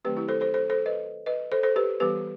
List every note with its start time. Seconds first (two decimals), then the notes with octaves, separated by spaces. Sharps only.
0.05 D#3 F#3 A3 C4 G4 B4
0.17 E4 G4
0.28 A4 C5
0.41 A4 C5
0.54 A4 C5
0.70 A4 C5
0.86 B4 D#5
1.26 B4 D#5
1.52 A4 C5
1.63 A4 C5
1.76 G4 B4
2.00 E3 G3 B3 G4 B4